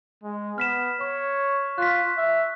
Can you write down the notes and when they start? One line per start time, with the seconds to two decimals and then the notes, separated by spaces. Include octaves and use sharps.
0.23 G#3
0.58 B3 F6 B6 E7
1.01 C#5 C#6
1.78 F4 F#6 B6
2.17 E5